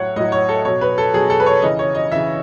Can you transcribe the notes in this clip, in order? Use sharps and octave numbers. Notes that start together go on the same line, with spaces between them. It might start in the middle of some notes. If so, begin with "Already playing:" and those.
Already playing: A2 F#3 C#5 F#5
A2 F#3 D#5
C#5
A4
B2 F#3 C#5
B4
A4
B2 F#3 G#4
A4
B4
C#5
C#3 E3 D#5
C#5
D#5
C#3 E3 E5